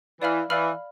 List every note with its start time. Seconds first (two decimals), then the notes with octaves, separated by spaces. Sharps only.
0.21 E3 D5 F5 B5 F6
0.50 E3 D5 F5 B5 F6